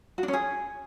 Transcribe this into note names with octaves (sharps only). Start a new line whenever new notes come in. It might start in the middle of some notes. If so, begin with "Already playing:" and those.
F#4
D4
C#4
G#4